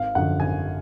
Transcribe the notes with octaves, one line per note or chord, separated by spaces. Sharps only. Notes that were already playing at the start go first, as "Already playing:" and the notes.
Already playing: G#1 F5
F#2 D3 F3 F#5
G#1 G#5